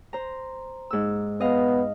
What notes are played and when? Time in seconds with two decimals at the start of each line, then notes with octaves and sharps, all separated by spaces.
0.13 C5 A#5
0.90 G#2 E6
1.40 B3 D#5 F5